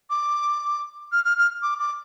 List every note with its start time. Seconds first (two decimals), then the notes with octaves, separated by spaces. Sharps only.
0.10 D6
1.12 F6
1.24 F6
1.38 F6
1.62 D6
1.79 D6